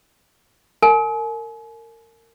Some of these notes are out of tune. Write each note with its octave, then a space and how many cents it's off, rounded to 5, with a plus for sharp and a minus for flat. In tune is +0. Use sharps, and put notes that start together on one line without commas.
A#4 -30 G#5 +40